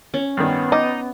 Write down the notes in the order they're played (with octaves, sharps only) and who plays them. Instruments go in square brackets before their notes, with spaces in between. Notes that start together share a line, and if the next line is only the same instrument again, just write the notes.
[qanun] C#4
[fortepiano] G2 D#3 [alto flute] B3
[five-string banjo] D#4 [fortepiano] D#5 D6